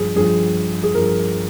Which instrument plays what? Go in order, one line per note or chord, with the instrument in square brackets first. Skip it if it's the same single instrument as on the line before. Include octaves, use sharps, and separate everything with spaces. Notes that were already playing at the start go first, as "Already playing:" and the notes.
Already playing: [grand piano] G2 F3 G#4
G2 F3 G#4
G#4
G2 F3 A#4